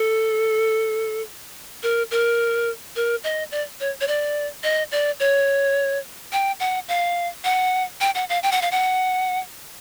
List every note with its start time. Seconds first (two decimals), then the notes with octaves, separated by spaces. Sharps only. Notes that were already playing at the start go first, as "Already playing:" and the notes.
Already playing: A4
1.83 A#4
2.11 A#4
2.96 A#4
3.24 D#5
3.52 D5
3.80 C#5
4.01 C#5
4.08 D5
4.63 D#5
4.92 D5
5.20 C#5
6.32 G5
6.60 F#5
6.88 F5
7.44 F#5
8.01 G5
8.15 F#5
8.29 F5
8.43 G5
8.52 F#5
8.62 F5
8.71 F#5